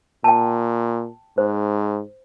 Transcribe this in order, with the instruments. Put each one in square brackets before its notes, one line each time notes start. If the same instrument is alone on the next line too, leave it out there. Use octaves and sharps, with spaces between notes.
[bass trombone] A#2 [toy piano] G5 A5
[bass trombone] G#2 [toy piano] C5